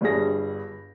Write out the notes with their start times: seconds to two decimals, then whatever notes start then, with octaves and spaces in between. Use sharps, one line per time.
0.01 G1 G2 G3 G#4 A#6